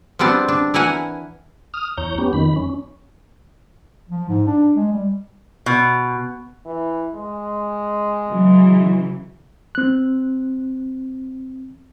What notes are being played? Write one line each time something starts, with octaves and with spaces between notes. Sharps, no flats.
F3 G3 B3 C4 D4 D5
D4
E3 E4 A#4 F#5 G#5
D#6 F6
E2 C#5 A#5 G6
B3 C#4 G4
F2 D#3 B5
C#4
F3
G#2
D4
G#3
G3
B2
E3
G#3
C#3 E3 F#3
C4 F#6